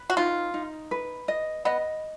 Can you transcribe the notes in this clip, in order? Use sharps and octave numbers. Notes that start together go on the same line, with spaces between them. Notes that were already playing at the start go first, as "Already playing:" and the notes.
Already playing: B4
F#4
D#4 F4
D#4
B4
D#5
B3 D#5